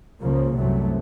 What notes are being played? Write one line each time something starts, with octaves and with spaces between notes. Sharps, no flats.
C#2 C#3 F3 A#3
C2 F#2 C3 F#3 A3